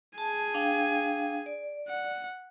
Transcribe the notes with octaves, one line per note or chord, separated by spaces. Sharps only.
G#4 G#5 A5
D4 F5 G5
D5
F#5